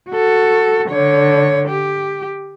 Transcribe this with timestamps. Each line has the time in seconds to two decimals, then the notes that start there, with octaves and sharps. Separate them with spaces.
0.10 F#4 A4
0.89 D3 C#5
1.69 G4